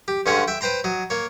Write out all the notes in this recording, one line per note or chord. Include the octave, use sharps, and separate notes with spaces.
G4
G2 D3 G#3 C#4 C#5 F#5
E5 G5
B4 C5 G5 A#5 C6
F#3 D#5
A#3 C#5